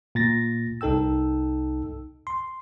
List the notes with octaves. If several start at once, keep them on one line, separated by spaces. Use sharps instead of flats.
A#2 A6 A#6
C2 D#4 A4 G5 E6
C6